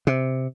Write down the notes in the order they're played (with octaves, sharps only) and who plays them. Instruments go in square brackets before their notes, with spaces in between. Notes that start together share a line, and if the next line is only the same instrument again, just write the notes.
[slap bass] C3